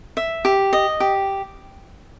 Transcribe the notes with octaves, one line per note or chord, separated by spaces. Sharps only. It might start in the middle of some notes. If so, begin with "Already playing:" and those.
E5
G4
D#5
G4